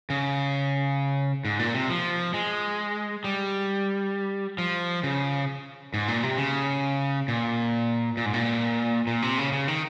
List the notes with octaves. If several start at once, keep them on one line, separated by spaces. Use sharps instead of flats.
C#3
G#2
A#2
C3
F3
G#3
G3
F3
C#3
G#2
A#2
C3
C#3
A#2
A#2
G#2
A#2
A#2
C3
C#3
C#3
D#3